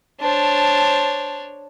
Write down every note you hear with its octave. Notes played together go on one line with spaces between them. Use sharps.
D4 C5 C#5 A5